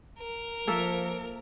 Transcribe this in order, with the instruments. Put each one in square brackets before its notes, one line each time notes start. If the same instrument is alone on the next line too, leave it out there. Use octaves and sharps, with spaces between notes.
[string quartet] A#4
[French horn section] F3 [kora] A#3 A4 E5